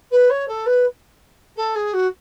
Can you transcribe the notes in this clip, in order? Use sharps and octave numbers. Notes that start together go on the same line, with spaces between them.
B4
C#5
A4
B4
A4
G#4
F#4